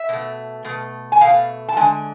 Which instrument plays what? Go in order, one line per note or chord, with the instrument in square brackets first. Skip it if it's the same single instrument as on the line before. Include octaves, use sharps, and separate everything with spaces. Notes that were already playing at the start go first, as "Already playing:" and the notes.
Already playing: [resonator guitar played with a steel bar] E5
B2 A3
B2 A3
G#5
B2 A3 F5
A5
D3 G#3 G#5